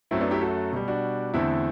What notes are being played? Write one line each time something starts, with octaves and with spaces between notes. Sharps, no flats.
F#2 F#3 A3 C4 E4
B3 D4
E4 G4
F#4 A4
B2 G3
D4 F#4
E2 D3 A3 C4 E4